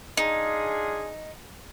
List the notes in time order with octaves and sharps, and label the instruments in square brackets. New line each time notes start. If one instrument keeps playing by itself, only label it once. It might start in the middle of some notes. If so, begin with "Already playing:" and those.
[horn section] D4 F4 G#4 [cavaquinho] D#4